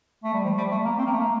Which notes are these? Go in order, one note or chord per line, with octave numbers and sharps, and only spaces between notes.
A3
G3
F3
G3
A3
A#3
C4
A#3
A3
A#3